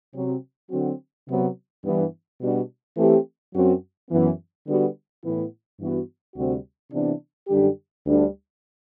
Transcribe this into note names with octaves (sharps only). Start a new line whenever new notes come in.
C3 F#3 C4
D3 F#3 C4 F#4
C3 F#3 B3
G2 E3 B3
B2 G3 D4 F#4
E3 A3 C4 G4
F#2 F#3 C4 F#4
F#2 E3 B3
D3 G3 B3 F#4
A2 E3 B3 E4
G2 E3 B3 F#4
D2 C3 G3 C4 F#4
C3 E3 B3 D4
F#2 D3 G3 D4 G4
D2 D3 G3 D4